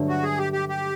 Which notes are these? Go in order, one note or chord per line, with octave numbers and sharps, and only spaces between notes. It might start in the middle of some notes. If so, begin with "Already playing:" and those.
Already playing: G2 D3 F#3 A3
F#4
G#4
G4
G4
G4